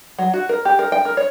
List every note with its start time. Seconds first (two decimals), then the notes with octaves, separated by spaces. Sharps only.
0.19 F#3
0.33 F#4
0.49 A#4
0.65 G4
0.79 A#4
0.92 G5
1.05 A#4
1.17 C#5